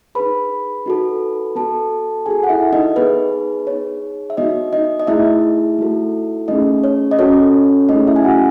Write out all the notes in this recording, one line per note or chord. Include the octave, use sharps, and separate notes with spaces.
D#4 G#4 B4 B5
D#4 F#4 A4
B3 F#4 A4 A5
D#4 F#4 G#4 A4 G#5
F#5
E4 E5
D#4 D#5
B3 D#4 G#4 B4
D#4 G#4 C#5
E5
B3 D#4 F#4 D#5
D#4 D#5
D#5
A3 D#4 E4 G#4 E5
A3 D#4 F#4 A4
A3 C#4 D#4 G#4 D#5
C#5
D#5
C#4 F#4 A4 C#5
A3 C#4 D#4 E4 G#4 D#5
E4 E5
G#5
F#4 F#5